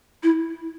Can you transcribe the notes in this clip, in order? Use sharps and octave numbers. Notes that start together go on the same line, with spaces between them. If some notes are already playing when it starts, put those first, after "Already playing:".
E4